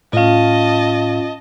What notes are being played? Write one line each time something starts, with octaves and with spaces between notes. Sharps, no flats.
A2 C#4 F4 D#5 F5 A5